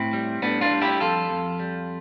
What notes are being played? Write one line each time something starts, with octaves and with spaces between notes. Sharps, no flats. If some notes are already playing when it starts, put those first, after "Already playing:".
Already playing: A2 C4 E4
G3
A2 B3 D4
D4 F4
G3
E4 G4
F2 F4 A4
F2
G3